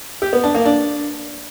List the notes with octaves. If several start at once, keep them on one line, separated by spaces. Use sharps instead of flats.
G4
B3
D4
A#3
D4